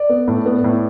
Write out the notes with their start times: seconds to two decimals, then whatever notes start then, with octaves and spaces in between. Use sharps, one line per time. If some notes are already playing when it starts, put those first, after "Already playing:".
Already playing: D5
0.09 B3
0.28 A2
0.46 B3
0.64 A2